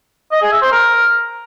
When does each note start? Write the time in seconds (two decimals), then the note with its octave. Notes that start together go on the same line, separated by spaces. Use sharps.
0.32 D#5
0.42 G#4
0.52 E5
0.62 C5
0.72 A#4